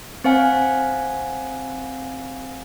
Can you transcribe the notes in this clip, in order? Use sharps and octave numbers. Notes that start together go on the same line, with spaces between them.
C4 C5 F5 G#5